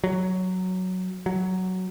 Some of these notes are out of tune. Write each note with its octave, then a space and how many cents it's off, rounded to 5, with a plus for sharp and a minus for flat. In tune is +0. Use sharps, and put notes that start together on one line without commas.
F#3 +0
F#3 +5